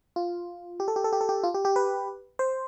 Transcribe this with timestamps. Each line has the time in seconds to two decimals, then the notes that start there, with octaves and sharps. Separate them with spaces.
0.16 F4
0.80 G4
0.88 A4
0.96 G4
1.04 A4
1.13 G4
1.21 A4
1.29 G4
1.44 F4
1.54 G4
1.65 G4
1.76 B4
2.39 C5